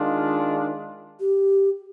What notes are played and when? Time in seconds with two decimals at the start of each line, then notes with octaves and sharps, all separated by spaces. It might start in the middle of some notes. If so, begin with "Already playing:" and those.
Already playing: D#3 G#3 D4 F4
1.20 G4